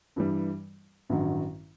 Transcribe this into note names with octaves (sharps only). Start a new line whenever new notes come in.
G2 E3 G3
A1 G2 D#3 F#3